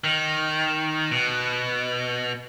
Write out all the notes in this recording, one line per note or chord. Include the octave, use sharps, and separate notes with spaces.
D#3
B2